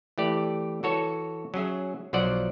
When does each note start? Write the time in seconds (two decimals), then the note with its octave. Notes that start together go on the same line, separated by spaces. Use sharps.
0.18 E3 A3 G4 D5
0.83 E3 F#4 A4 C#5
1.54 F#3 C#4 G#4 E5
2.13 B1 F3 F#3 C5 D5 F#5